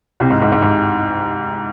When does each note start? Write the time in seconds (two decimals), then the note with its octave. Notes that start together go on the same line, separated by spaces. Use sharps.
0.20 C2 C3
0.30 G#2
0.42 G#2
0.52 G#2
0.62 G#2